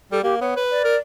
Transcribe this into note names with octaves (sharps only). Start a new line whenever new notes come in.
G3 A4
A#3 G4
B3 C#5
B4
D5
A#4